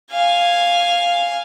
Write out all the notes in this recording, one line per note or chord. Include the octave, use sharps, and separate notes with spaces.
F5 G#5